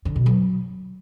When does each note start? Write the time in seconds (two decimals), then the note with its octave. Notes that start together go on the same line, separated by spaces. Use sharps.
0.05 D3
0.16 B2
0.26 F#3